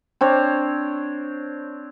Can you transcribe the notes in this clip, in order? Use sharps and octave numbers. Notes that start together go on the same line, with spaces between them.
C4 D4 C#5